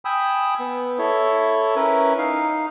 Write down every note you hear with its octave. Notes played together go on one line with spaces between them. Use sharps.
G5 G#5 B5 D#6 E6
B3
E4 A4 C#5
C#4 E4 A#4 B4
D#4 F5